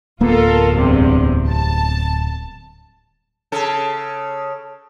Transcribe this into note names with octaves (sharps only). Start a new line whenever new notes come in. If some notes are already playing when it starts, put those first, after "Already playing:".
D1 A#3 B3 F4 A4 A#4
E2 G2 C3
A5
C#3 A4